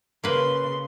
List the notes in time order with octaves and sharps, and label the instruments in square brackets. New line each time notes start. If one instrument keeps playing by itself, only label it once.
[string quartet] C#3 C6 [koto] A#3 B4